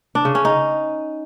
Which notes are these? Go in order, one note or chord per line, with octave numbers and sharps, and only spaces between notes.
D4
C#3
C#4
D#4